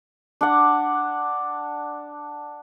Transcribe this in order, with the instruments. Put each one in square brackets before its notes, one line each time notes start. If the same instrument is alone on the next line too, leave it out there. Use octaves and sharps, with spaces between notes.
[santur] D4 F#5